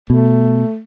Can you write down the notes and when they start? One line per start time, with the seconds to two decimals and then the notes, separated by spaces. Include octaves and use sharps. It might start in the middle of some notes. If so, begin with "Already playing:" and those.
0.10 B2 A3